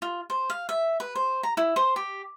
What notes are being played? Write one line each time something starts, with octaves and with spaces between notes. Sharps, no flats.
F4
C5
F5
E5
B4
C5
A#5
E4
C5
G4